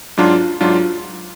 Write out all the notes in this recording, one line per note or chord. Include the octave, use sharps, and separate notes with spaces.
G#2 F#3 D4 F4
G#2 F#3 D4 F4